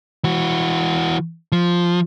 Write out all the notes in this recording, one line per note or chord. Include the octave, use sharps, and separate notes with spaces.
E3 F#4
F3